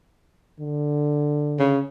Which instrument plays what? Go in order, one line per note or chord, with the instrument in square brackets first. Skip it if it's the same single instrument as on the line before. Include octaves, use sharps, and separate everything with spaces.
[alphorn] D3
[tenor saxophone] C#3